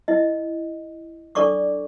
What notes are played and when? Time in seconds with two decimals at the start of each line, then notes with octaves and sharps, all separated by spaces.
0.08 E4 D#5
1.35 D4 A4 D5 C#6 D6